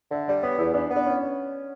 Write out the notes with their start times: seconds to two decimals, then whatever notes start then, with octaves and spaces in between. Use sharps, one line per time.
0.12 D3 E5
0.28 G3 D5
0.43 B3 C#5
0.58 E2 E4
0.74 B3 D4
0.91 B3
0.96 D4
1.06 C#4